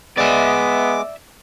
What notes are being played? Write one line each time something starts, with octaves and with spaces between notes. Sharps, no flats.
G#3 B3 D5 E5 D6